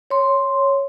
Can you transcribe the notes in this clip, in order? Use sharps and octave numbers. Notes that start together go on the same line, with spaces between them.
C#5 C6